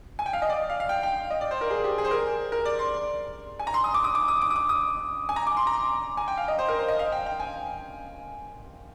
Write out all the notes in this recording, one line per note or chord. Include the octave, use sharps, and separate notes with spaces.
G#5
G5
F5
D#5
D5
F5
F5
G5
G5
D#5
D5
C5
A#4
G#4
G4
G#4
C5
A#4
A#4
D5
C6
G#5
A#5
C6
D#6
D6
D#6
D6
D#6
D6
D#6
D6
D#6
G#5
A#5
D6
C6
A#5
G#5
G5
F5
D#5
C5
A#4
C5
D#5
F5
G5
G5
G#5